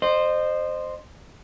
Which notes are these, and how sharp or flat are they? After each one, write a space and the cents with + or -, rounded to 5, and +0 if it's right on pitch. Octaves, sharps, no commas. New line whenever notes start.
C5 +0 D#5 -30